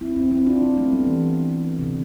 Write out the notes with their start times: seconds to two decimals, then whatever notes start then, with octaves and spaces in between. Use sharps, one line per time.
0.01 C4 E4
0.16 C4 E4
0.31 C4 E4
0.46 D4 F4
0.62 C4 E4
0.77 A3 C4
0.92 G3 B3
1.07 E3
1.79 C3
1.83 D3